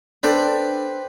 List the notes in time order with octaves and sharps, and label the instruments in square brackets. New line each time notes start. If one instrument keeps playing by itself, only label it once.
[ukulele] D4 A4 D5 [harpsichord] B4 C5 G5